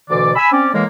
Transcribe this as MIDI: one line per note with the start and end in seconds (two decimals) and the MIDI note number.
0.09 0.33 38
0.09 0.33 47
0.09 0.33 50
0.09 0.33 52
0.09 0.33 74
0.35 0.50 80
0.35 0.50 83
0.35 0.50 88
0.51 0.68 60
0.51 0.68 61
0.51 0.68 74
0.73 0.83 45
0.73 0.83 52
0.73 0.83 56
0.73 0.83 58